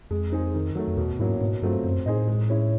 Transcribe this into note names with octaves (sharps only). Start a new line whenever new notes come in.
F2 G#3
C4 D#4 G#4
D#3
F#3 A3
F2
E2 B2
G#2 F#3 A#3 C#4 E4
G#2 B2
G2 F#3 A3 C4 F4
F#2 C4
A2 D#4 G#4 C5 D#5
G#3
C#4 E4